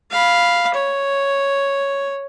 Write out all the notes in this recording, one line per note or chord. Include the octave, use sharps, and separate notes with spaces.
F5 B5
C#5